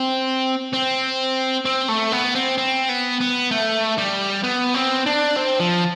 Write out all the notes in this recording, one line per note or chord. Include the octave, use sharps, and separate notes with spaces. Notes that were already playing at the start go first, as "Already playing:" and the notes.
Already playing: C4
C4
C4
A3
B3
C4
C4
B3
B3
A3
G3
B3
C4
D4
C4
F3